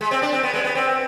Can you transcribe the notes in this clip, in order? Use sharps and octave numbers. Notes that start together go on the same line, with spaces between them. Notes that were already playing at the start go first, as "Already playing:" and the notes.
G#3
C4
D4
C4
B3
G#3
B3
C4